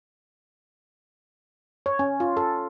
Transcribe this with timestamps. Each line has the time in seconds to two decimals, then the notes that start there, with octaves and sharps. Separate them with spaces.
1.86 C#5
1.99 C#4
2.20 F4
2.37 A4